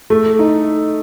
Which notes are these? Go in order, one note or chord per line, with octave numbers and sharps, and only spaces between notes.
A3
D#4